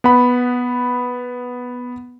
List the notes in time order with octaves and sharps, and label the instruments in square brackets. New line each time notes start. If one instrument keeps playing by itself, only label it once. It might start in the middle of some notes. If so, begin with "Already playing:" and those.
[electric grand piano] B3 F#5 B5